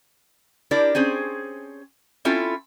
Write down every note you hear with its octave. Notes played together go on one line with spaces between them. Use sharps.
D4 E4 G4 A#4 D5
C4 C#4 G#4 C5
C4 C#4 E4 F4 A4